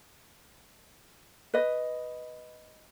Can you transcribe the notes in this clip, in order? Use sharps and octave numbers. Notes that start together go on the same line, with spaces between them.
B4 D#5